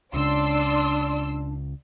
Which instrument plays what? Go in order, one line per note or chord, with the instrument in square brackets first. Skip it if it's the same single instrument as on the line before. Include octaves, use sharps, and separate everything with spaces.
[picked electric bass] C#2 C#3 [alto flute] D4 [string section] D5 C6 E6